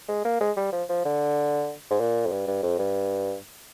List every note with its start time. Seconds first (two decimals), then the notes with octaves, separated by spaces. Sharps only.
0.09 G#3
0.25 A#3
0.41 G#3
0.57 G3
0.73 F3
0.89 F3
1.05 D3
1.91 G#2
2.00 A#2
2.26 F2
2.32 G2
2.47 G2
2.63 F2
2.79 G2